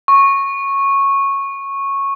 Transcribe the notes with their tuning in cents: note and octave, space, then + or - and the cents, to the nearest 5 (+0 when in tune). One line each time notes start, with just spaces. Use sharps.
C#6 -10